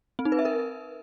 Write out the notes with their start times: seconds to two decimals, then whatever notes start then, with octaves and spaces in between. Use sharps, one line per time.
0.19 C4
0.25 D#4
0.32 B4
0.39 E5
0.45 A#4